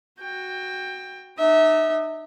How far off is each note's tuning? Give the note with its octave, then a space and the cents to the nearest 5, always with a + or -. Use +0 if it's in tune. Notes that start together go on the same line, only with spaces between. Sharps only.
F#4 +5 G5 +20
D#4 -35 E5 -30